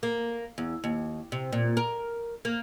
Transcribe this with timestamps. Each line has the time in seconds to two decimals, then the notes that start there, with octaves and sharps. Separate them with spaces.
0.03 A#3
0.58 E2
0.84 D#2
1.32 C3
1.53 A#2
1.77 A#4
2.45 A#3